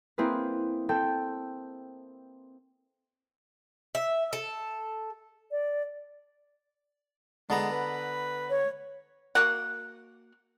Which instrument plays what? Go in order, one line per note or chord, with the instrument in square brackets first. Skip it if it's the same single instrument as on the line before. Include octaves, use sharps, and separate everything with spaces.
[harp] A#3 C4 E4 G#4 B4
C4 A4 G5
[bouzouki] E5
A4
[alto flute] D5
[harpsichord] D3 B3 A#5 [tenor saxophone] G#3
[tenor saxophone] B4
[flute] C#5
[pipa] A#3 F#4 F#5